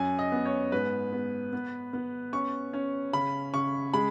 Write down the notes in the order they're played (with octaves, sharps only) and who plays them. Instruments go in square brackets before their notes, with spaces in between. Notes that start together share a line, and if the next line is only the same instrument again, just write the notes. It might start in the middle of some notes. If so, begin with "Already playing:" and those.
Already playing: [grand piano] F#2 G#5
D#5
B3
C#5
G#2 B4
B3
B3
B3
C#4 C#6
C#4
C#3 B5
C#3 C#6
G#3 B5